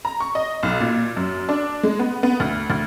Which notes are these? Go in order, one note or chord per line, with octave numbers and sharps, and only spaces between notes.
A#5
C#6
D#5
B1
A#2
F#2
D4
G#3
B3
B3
D2
D2